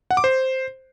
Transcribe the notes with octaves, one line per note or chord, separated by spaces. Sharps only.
F#5
D6
C5